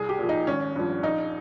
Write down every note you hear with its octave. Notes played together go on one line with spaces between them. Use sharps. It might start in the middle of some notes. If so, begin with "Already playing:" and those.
Already playing: C2 G#4
G4
A#2 F3
D#4
G#1 C#4
G2 F3
A#1 D#4